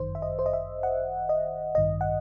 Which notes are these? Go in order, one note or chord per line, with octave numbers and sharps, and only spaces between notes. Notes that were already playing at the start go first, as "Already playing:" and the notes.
Already playing: G1 F#2 D#3 C5
E5
D#5
C5
D#5
E5
F#5
D#5
A1 G2 D#3 D#5
F#5